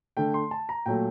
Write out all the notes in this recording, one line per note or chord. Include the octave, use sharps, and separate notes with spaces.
D3 A3 G5
C6
A5
A#5
A#2 F#3 A3 G5